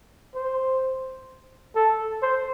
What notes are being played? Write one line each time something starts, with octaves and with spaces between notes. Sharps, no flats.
C5
A4
C5